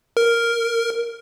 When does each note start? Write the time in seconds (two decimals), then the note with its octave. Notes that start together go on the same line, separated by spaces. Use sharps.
0.17 A#4